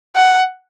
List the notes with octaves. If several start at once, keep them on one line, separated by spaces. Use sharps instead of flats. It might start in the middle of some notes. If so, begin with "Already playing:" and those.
F#5